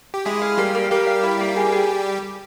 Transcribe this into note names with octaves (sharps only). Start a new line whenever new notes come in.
G4
G#3 E4 G#4
F5
G3 A#3 G4
A#3
G3 A#3 G4
F5
E4
A#3
G#4
G#4